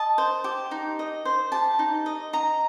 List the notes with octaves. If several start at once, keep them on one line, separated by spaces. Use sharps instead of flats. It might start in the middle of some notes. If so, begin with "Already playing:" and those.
Already playing: D#5 A5
C5
G4
D#4
D#5
C5
G4 A5
D#4
D#5
D#5 A#5